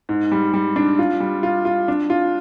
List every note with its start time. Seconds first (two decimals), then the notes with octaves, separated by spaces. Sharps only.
0.09 G#2
0.32 G3
0.54 G3
0.76 D4
0.99 F4
1.20 G3
1.43 F4
1.65 F4
1.88 D4
2.10 F4